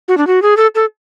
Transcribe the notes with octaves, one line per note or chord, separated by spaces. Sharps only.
F#4
D4
F#4
G#4
A4
A4